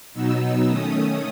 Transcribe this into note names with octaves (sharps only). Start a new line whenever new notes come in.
B2 F#3 B3 D#4 E6
D#3 A3 C#4 D#6